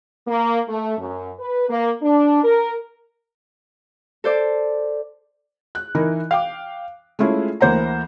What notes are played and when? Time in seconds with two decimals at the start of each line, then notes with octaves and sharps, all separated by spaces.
0.27 A#3
0.68 A3
0.97 F#2
1.39 B4
1.68 A#3
2.02 D4
2.43 A#4
4.24 A4 C5 D5
5.75 F#6
5.95 E3 D#4 E4 A#4
6.31 F5 G5 D6
7.19 G#3 A3 C#4 E4 F4 G#4
7.61 D2 E3 A#3 C5 F#5 A#5